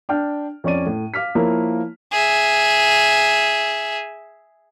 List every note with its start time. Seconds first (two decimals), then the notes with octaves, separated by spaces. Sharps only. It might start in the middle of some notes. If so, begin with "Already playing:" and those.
0.09 D4 G5 F6
0.64 F2 C#4 C#5 D5 D#7
0.86 A2
1.14 F5 D6 F6 B6
1.35 F3 A#3 E4 A#4 C#5
2.12 G#4 E5